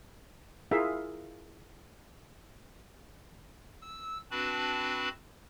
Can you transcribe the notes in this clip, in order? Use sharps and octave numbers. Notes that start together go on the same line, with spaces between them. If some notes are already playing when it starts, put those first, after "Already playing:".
E4 F4 G#4 A#4 E5 F5
E6
C4 D4 F#4 B4 A5 B5